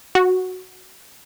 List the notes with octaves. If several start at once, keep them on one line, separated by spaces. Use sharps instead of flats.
F#4